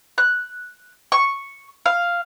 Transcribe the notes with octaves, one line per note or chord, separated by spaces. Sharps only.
F#6
C#6
F5